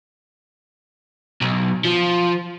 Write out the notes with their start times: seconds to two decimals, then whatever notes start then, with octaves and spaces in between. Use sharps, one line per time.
1.41 B1
1.85 F3